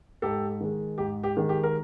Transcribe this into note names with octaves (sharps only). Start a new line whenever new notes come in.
G#2 G4 A4
D#3 G#3
G#2 G4
G4
D#3 G#3
G4
A#4